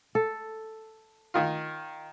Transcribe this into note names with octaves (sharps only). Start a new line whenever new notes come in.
A4
D#3 F4